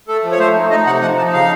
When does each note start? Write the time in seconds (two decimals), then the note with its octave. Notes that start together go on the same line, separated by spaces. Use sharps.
0.08 A3 A4
0.23 F3
0.32 C#5
0.39 A3 C5
0.55 D#4
0.70 D#4 D#5
0.86 C3 F#5
1.02 F3 F#5
1.17 D#4 A5
1.33 C#3 F5